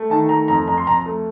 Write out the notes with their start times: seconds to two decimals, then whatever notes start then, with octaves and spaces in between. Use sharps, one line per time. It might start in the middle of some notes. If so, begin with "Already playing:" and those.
Already playing: A3
0.10 D#3 A5
0.29 A3 A#5
0.48 F2 A#5
0.68 F2 A#5
0.78 C6
0.87 F2 A#5
1.06 A3